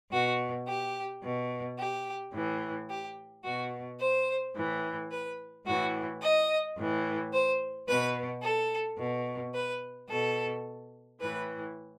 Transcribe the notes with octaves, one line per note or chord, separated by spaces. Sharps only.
B2 F#4
G4
B2
G4
A2 E3
G4
B2 F#4
C5
A2 E3
B4
A2 E3 F#4
D#5
A2 E3
C5
B2 B4
A4
B2
B4
B2 A4
A2 E3 B4